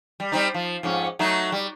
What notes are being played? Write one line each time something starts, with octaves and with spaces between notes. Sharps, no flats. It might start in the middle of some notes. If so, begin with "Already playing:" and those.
G3
G3 C4 D#4
F3
F2 G#2 C#4
F#3 A3 D#4
G3